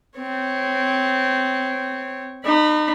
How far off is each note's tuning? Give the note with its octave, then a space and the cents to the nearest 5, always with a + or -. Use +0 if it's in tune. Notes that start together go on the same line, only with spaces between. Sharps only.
C4 -15 C#5 -15
D#4 -35 B5 +0